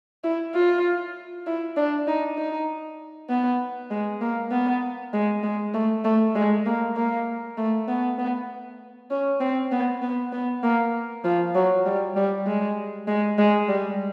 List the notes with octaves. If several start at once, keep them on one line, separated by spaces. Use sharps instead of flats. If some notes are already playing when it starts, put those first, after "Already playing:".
E4
F4
E4
D4
D#4
D#4
B3
G#3
A#3
B3
G#3
G#3
A3
A3
G#3
A#3
A#3
A3
B3
B3
C#4
C4
B3
B3
B3
A#3
F3
F#3
G3
G3
G#3
G#3
G#3
G3